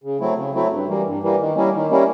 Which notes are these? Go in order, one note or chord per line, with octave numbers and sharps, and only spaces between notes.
C#3
F#3 A3 C4 E4
C#3
F#3 A3 C4 E4
G2
E3 G3 A#3
G2
E3 G3 A#3
D#3
G3 A#3 C#4 E4
D#3
G3 A#3 C#4 E4